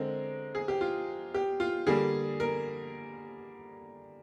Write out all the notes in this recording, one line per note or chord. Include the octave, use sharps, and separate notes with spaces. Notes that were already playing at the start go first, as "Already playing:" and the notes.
Already playing: D3 G#3 C4 A#4
G#4
G4
F4
G4
F4
D3 G3 A#3 G#4
A#4